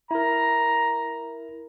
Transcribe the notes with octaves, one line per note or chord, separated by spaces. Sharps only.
E4 A#4 A#5